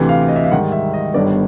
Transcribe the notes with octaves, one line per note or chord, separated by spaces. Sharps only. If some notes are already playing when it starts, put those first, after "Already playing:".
Already playing: D2 C3 E3
F5
D#5
E5
F5
G#2 D#3 G3 F#5
E5
D#5
G1 G2 D#3 G3 B3 D5